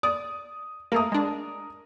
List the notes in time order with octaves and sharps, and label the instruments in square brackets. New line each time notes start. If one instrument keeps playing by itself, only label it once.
[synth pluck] D5 [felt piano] D#6
[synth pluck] A3 A#3 [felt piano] A#4 D#6
[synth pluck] G#3 D4